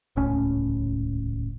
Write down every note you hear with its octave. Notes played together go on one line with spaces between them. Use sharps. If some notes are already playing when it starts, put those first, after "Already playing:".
D#1 C#2 A2 C#4